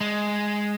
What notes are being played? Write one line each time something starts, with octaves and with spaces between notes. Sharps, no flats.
G#3